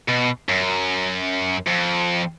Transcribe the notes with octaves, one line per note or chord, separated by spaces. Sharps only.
B2
F#2
F2